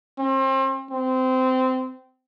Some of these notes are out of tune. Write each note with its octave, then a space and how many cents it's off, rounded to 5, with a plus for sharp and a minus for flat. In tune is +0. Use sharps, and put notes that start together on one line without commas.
C4 +35
C4 -20